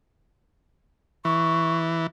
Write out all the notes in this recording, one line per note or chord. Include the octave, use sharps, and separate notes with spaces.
E3 C#6